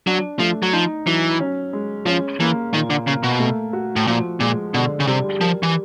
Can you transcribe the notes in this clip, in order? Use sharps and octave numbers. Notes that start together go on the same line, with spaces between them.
F#3 D4
F3 A3
F#3
F3 D#4
E3 F#3
C#4
G#3
F3 C#4
E3 A#3
A#2 D#3
D3
C#3 A#3
B2
A3
F#4
A2
A#2 F3
A#2 G#3
B2 D3
C#3
C3 G3
F3 A#4
E3